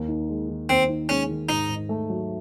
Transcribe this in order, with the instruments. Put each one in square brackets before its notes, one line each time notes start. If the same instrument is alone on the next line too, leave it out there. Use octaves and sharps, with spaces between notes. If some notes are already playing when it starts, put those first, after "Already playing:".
Already playing: [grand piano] D#2
D#4
G#3
D#3
[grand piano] D#2 [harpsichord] C4
[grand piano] D#4
[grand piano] G#3 [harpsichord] C#4
[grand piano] D#3
[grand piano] G#2 [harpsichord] D#4
[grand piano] G#2
A3
F#3